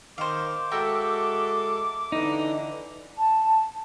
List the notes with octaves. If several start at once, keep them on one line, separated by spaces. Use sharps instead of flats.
D#3 C5 F5 D6
G#3 F#4 A4 A#4 E5 G5
D3 E3 D#4
A5